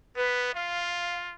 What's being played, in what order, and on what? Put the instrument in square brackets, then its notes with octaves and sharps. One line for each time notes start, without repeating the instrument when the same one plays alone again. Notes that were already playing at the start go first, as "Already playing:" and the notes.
[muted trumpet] B3 [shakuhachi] B4
[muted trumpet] F4 [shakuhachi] F5